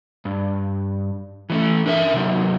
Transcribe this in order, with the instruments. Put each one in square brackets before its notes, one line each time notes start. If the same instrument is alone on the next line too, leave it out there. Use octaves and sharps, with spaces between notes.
[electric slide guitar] G2
E3 A3 C#4
D4 A#4 E5
C3 D#3 F#3